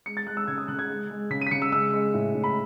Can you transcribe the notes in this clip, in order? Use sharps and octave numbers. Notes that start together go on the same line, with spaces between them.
G#3 C#7
A6
G#3 F#6
E6
C#3 G#6
D#6
C#3 F#6
G#6
G#3
G#3
C#3 B6
D#7
B6
C#3 C#7
E6
G#3 E6
G#3
A2
A2
B5